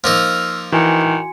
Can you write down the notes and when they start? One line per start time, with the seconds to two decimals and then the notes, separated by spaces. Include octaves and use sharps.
0.04 F3 A#3 D#4 E6 F6
0.72 D#3 E3 F#4 G#5 C#7